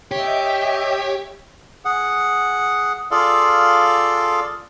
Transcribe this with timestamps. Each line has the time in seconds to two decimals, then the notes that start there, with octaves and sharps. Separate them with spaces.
0.11 G4 C#5 D#5 E5 G5
1.85 G#4 F#5
3.11 F4 G#4 A4 D5 F5